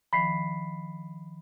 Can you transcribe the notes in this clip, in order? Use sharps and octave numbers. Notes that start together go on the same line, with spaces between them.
D#3 F3 B5 B6 C7